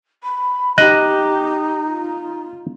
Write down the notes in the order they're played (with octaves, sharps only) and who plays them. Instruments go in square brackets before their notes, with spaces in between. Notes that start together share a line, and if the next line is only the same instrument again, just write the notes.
[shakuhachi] B5
[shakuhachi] D#4 [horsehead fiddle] G4 [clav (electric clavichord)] D#5 [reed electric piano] F#6
[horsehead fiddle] F4